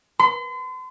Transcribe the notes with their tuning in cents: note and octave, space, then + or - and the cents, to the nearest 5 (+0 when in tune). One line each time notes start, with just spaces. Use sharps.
C6 -40